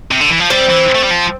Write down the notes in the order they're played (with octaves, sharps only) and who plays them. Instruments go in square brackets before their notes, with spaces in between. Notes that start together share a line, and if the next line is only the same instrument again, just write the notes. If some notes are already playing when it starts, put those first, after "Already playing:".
[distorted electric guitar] C3
D3
E3
F3
[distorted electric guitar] G3 [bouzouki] C4 C5
[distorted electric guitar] E3
A3
G3
F3